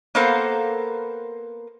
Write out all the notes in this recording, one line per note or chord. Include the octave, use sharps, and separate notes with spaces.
A#3 B3 A4 A#4 C5 F5